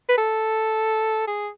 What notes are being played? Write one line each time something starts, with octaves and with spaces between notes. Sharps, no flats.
B4
A4
G#4